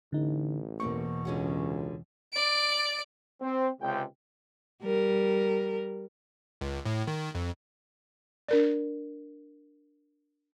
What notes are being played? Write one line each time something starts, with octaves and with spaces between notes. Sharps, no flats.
A1 D3 D#4
E2 B2 A#3 C4 C#6
C#2 D3 C#4 F#4
D5 D7
C4
C#2 C3 G5
G3 A#4
C#2
A2
D#3
F2
D4 A#4 D5